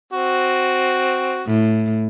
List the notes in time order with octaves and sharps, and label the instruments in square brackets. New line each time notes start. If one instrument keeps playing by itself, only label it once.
[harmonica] C4 F#4
[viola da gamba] A2